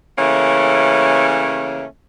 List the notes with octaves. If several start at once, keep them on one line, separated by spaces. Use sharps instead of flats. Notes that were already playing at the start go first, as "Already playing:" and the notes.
C#3 E3 A3 A#3 C#4